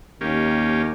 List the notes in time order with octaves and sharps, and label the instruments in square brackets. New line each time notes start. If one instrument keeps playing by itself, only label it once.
[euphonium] D#2 [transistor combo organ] A#3 C#4 G4